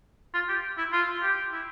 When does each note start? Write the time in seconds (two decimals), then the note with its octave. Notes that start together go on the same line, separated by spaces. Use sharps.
0.34 F4
0.48 G4
0.78 E4
0.92 F4
1.22 G4
1.52 E4